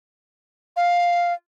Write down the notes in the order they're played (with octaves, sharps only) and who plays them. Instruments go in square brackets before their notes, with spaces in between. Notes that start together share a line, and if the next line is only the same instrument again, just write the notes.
[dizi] F5